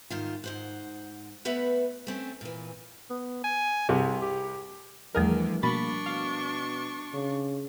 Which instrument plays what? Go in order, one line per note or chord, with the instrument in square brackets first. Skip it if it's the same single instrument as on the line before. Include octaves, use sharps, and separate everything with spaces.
[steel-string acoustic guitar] G#2 D#3 F4
G#2 C5 F#5
A3 B3 B4 E5 F#5
A3 C4 C#4
A#2 E3
[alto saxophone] B3
G#5
[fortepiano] C2 C3 [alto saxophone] G#4
[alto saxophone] G4
[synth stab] E2 G#4 A#4 [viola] D3 [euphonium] E3 [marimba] F3 G3 A3
[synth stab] B2 B5 A6 [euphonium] A#3 [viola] D4 C#6
[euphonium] B2 [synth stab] F5
[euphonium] C#3